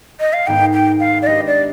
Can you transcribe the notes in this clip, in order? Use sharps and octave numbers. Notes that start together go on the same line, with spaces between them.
D#5
F5
G#2 D#3 B3 D#4 G#4 G5
G5
F5
D5
G#3 D4 G4 B4 D#5
D5